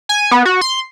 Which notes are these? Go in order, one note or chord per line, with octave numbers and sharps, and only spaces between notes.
G#5
B3
F#4
C6